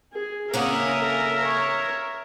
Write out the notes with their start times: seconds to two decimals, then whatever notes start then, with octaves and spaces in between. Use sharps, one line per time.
0.13 G#4
0.54 C#3 A#3 C#4 A#4 E5 F#5 D#6
0.99 A4
1.42 C#5